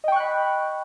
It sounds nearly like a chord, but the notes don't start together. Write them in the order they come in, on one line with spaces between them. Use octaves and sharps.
D#5 G5 C#6 F#6 B5